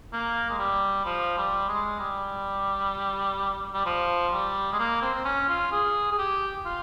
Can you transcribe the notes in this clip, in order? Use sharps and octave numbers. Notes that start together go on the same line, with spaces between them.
A#3
G#3
G3
F3
G3
G#3
G3
G3
F3
G3
G#3
A#3
C4
C4
C#4
F4
G#4
G#4
G4
F4